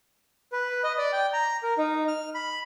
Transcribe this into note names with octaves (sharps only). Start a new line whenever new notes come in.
B4
D#5
D5
G5
A#5
A#4
D#4
F6
B5